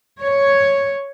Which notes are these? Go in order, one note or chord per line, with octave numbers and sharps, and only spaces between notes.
C#5